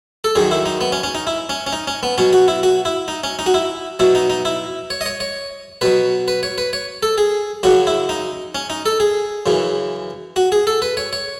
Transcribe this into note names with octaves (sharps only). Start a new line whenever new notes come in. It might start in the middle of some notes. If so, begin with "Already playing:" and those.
A4
F#2 D#3 F#3 G#4
E4
D#4
B3
C#4
C#4
D#4
E4
C#4
C#4
D#4
C#4
B3
B2 F#3 C#4
F#4
E4
F#4
E4
D#4
C#4
D#4
F#4
E4
B2 F#3 E4
D#4
D#4
E4
C#5
D#5
C#5
C#5
B2 F#3 B4
B4
C#5
B4
C#5
A4
G#4
F#2 C#3 F#3 F#4
E4
D#4
C#4
D#4
A4
G#4
F#2 C#3 E3
F#4
G#4
A4
B4
C#5
C#5